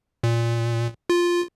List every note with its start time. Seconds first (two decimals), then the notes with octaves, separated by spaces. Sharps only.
0.24 A#2
1.10 F4